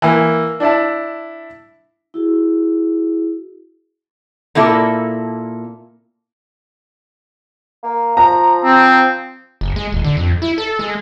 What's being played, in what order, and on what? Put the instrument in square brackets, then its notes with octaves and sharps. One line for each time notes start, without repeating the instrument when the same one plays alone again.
[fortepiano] E3 A#3
D4 E4 A5
[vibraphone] E4 F#4 G#4
[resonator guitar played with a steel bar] A#2 A#3 E4 A4
[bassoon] A#3
[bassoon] F3 [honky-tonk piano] A#5
[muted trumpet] C4
[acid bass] F#1
G#3
D#1
D3
F2
E4
A4
G#3